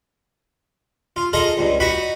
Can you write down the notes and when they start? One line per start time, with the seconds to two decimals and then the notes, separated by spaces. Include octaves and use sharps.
1.16 F4
1.33 F4 G#4 A4 D#5 A#5
1.58 C#2 G2
1.80 D#4 F#4 F#5 B5